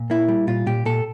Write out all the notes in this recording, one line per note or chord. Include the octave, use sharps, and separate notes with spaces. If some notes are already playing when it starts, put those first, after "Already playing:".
Already playing: A#2
A#3 E4
G3
A#2 F4
A#2 G4
A#2 A4